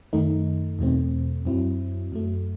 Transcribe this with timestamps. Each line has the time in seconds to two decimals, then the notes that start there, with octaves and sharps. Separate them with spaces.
0.13 F#2 D#3 A3 D#4
0.79 E2 B2 A3 C4
1.45 F#2 F#3 C4 E4
2.12 F#2 F#3 A3